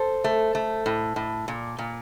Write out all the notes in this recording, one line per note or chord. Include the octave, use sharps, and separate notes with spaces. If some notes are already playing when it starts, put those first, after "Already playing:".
Already playing: A4 C5
A3
A3
A2
A2
A#2
A#2